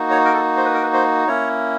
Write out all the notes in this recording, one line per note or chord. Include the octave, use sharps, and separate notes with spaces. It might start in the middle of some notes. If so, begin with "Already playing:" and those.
Already playing: A#3 D#4 F#4
C#5
A#4
A4
C5
B4
A#4
B4
C5
A#3 C#4 E4 C#5